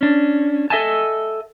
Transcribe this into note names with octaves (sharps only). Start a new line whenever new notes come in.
C#4 D4
A4 D#5 E5 F#5 G#5 A5